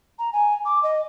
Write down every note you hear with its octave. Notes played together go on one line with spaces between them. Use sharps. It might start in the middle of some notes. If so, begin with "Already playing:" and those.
A#5
G#5
D6
D#5